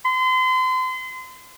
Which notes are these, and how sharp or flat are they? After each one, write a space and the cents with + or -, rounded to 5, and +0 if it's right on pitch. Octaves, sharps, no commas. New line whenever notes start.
C6 -35